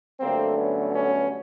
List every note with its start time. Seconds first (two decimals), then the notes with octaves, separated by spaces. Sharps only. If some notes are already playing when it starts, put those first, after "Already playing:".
0.20 G2 D3 F#3 A3 A#3 C4
0.57 B3 C#4
0.94 B3 C#4